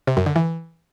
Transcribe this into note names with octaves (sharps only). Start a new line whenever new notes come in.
C3
F#2
D3
E3